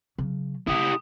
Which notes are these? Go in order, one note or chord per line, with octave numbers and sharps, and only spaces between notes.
C#3 F#3
C#3 A3 E4 G4 D#6